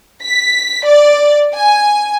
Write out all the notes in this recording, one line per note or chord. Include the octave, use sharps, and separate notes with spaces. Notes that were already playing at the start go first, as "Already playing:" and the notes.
B6
D5
G#5